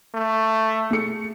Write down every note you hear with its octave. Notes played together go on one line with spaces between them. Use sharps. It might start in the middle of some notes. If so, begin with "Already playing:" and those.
A3
A3 G#4 C#7